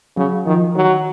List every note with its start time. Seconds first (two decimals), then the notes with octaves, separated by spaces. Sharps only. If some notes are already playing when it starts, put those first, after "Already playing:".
0.17 C#3 F#3
0.46 D#3 F3
0.76 D#3 F#3